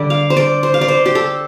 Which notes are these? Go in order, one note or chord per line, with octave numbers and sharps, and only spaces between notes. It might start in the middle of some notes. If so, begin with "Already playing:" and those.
Already playing: D3 G3 D5
F5
C5
D5
C5
F5
D5
C5
G4
A4